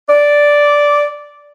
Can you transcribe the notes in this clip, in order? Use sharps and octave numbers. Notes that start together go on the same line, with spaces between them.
D5